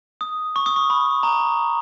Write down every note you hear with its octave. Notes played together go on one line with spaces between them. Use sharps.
D#6
C#6
D#6
C#6
B5
A#5